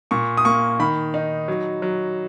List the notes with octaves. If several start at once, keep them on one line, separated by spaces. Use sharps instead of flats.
A#2 C#6
D#6
A#3 C#6
D#3 B5
D#4
F#3
F#3